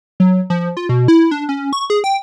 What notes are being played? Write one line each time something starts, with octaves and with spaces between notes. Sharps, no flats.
F#3
F3
F4
B2
E4
D4
C#4
C#6
G#4
G5